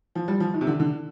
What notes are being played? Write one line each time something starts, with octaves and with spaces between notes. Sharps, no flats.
F3
G3
F3
D#3
C3
D3
D3